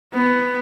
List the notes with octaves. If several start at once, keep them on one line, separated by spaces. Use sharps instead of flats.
B3